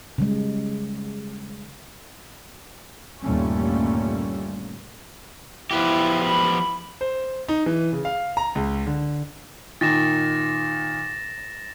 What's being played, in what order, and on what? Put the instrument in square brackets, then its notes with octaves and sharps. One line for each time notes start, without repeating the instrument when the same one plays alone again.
[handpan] C#3 G3 G#3
[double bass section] G1 D#2 A#2 G3 A3 C#4
[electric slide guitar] F3 B3 G4 [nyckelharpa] E4
[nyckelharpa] B5
[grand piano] C5
D#4
E3
C#3
F5
A#5
C#2
D3
[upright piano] A#2 D#3 [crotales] A6 A#6 E7